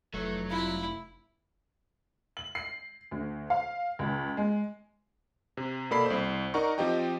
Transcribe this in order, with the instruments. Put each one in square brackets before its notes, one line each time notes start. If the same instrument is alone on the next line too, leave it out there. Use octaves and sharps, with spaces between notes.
[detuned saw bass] F1 [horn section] E3 A3 [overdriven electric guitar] F#3
[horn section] G3 F4 [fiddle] E4
[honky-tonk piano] F#7
C7
D2
F5
C#2
G#3
[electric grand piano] C3
B2 A#3 A4 D5 B5 C7
C2 C5
D#4 A#4 D5 F#5 A#5 C#6
F3 C4 G4 D#5 G5